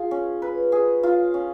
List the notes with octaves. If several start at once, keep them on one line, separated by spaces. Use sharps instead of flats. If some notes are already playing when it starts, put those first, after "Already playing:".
Already playing: F4 G#4
C#4
B4
G#4
F4
C#4